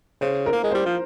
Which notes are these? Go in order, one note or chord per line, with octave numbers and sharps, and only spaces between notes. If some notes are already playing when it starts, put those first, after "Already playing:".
C#3 C5
A#4
A#3
G#3
C5
G3
F3